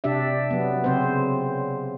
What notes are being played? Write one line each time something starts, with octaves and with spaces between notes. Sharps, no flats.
C3 D4 G4 D5 E5
F#3 B3
C#3 C4 C5